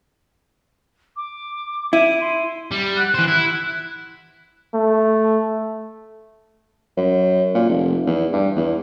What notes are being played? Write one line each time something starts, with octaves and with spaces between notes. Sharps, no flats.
D6
E4 D#7
C6
G3
F#5 F#6
E3 C5
E4
A3
F#2
A#2
F1
E2
G2
E2